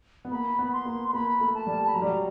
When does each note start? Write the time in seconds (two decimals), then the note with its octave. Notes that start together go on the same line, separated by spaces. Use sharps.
0.25 B3
0.31 A#3 B5
0.59 B3
0.73 C6
0.85 A#3
1.08 C6
1.13 A#3 B5
1.40 A3
1.54 A5
1.67 G3
1.87 B5
1.94 F#3 A#5
2.02 G3
2.10 F#3